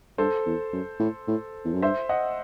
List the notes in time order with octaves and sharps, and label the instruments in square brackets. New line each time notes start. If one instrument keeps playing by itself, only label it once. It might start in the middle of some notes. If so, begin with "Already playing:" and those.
[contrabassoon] G2 [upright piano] A4 C5
[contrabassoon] E2
F#2
A2
A2
E2
F#2
[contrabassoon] G2 [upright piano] C5 E5
[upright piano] D#5 F#5